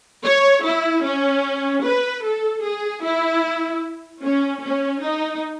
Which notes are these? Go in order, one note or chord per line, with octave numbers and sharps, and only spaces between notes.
C#5
E4
C#4
B4
A4
G#4
E4
C#4
C#4
D#4